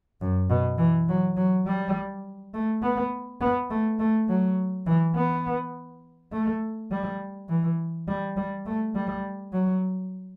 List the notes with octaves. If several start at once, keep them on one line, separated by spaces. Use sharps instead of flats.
F#2
B2
E3
F#3
F#3
G3
A3
B3
B3
A3
A3
F#3
E3
B3
A3
G3
E3
G3
G3
A3
G3
F#3